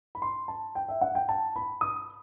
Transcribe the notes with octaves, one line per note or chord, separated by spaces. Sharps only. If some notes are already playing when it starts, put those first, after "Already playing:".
B5
C6
A5
G5
E5
F#5
G5
A5
B5
D#6